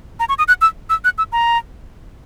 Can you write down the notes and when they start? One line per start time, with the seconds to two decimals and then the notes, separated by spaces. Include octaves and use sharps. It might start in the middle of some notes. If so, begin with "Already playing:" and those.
0.20 A#5
0.29 C#6
0.38 D#6
0.48 F#6
0.61 E6
0.90 E6
1.05 F#6
1.18 E6
1.32 A#5